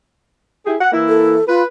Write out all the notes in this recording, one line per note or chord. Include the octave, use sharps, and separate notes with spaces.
E4 G4 G#4
F#5
E3 A#3 E4
A4
F4 B4